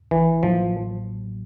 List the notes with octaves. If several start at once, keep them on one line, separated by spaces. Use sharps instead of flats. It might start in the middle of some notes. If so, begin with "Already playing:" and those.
A1 E3
A2 F3 F#3 A#3